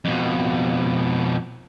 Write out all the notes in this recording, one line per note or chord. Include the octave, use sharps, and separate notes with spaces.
F2 B2